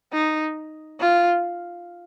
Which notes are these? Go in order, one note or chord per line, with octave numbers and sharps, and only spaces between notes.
D#4
F4